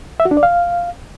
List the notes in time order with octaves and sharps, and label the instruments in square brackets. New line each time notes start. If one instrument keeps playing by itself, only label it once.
[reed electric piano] E5
F#4
D4
D5
F5